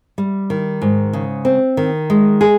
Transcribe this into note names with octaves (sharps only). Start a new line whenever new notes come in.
G3
D#3
G#2
C#3
C4
D#3
G#3
G#4